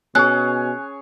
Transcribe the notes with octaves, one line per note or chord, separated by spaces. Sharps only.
B2 C#4 G#4 C#5 F#6